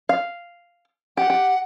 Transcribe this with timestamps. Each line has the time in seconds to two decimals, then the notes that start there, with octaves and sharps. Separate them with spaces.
0.09 F5
1.17 G4 F#5
1.30 G4